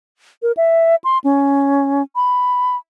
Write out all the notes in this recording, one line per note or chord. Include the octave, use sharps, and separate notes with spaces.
A#4
E5
C6
C#4
B5